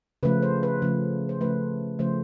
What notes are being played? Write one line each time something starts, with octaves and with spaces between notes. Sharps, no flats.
C#3 F3 A3 B4
C5
B4
C#3 F3 A3
C5
C#3 F3 A3 B4
C#3 F3 A3 C5